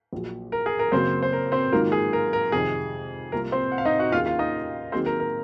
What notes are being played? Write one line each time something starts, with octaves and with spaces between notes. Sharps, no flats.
A#1 A#2 F#3
A#4
G#4
A#4
F#2 C#3 F#3 A#3 C4 C5
C5
A#4
C4 C5
G#2 D#3 F#3 A#3 F4 A#4
G#4
A#4
A#4
F2 C3 D#3 G#4
C2 C3 F3 A#3 F4 A#4
C4 C5
F#5
F5
D#4 D#5
F#4 F#5
D#2 D#3 A#3 C#4 F4 G#4 F5
F4 F5
D#4 D#5
D#3 F#3 A#3 C4 D#4 G#4 C5
A#4
A#4